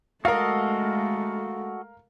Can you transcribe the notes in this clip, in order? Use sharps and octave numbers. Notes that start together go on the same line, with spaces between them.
G#3 A3 F#4 A4 A#4 D#5 F5